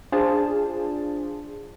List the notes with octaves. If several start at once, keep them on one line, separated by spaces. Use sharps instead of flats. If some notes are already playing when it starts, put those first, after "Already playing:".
D4 F4 G#4 C5 A5